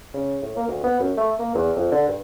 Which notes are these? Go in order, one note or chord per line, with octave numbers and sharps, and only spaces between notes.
C#3
A2
A#3
D2
B3
F#2
A3
A#3
E2
F2
D3
G2